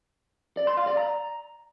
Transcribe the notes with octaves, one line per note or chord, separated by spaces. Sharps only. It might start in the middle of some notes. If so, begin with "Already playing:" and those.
D5
C6
F5
D5
A#5